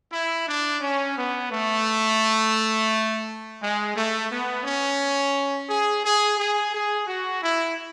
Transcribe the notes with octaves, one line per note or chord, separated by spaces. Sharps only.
E4
D4
C#4
B3
A3
G#3
A3
B3
C#4
G#4
G#4
G#4
G#4
F#4
E4